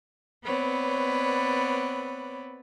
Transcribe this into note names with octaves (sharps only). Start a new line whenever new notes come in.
B3 C4 B4 C#5 D5